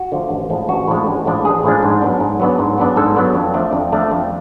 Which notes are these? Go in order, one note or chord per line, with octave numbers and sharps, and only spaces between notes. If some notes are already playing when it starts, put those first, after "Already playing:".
Already playing: F#4
D3 F3 A3
A1
A2 F3 G#3 D4
A1 F#4
A2 F3 G#3 D4
A1
A2 F3 G#3 D4
A1 G#4
A2 F3 G#3 D4
G#2
F#3 B3 D4
G#2
F#3 B3 D4
G#2
F#3 B3 D4
G#2 A4
F#3 B3 D4
F2
F3 A3 D4
F2
F3 A3 D4
F2